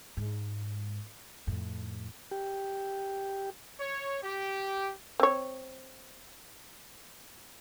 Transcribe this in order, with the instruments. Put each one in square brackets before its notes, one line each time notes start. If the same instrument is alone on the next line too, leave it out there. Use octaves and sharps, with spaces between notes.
[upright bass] G#2
F2 A2
[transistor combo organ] G4
[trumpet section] C#5
G4
[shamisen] C4 C#5